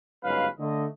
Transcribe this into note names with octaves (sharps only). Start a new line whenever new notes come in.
G1 G#2 F#3 C#4 B4 F5
D3 A3 D#5